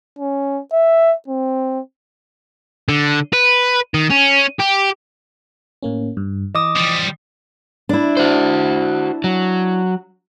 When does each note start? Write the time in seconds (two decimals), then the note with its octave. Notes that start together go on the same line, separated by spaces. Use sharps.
0.19 C#4
0.73 E5
1.28 C4
2.89 D3
3.33 B4
3.94 D#3
4.10 C#4
4.60 G4
5.83 A2 A#3 C#4
6.17 G2
6.55 E3 D#5 D6 D#6
6.76 F3 G3
7.89 D4 E4
8.17 F#4 C5
9.24 F#3